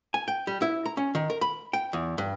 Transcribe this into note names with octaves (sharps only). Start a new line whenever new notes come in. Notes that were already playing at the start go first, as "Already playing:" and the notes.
G#5
G5
G3
E4
A#5
C#4
D#3
A#4
B5
G5
E2
G2